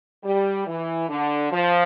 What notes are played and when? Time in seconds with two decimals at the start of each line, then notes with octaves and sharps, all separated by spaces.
0.24 G3
0.67 E3
1.09 D3
1.52 F3